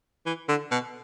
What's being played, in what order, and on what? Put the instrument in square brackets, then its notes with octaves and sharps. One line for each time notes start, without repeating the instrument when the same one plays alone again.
[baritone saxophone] E3
D3
B2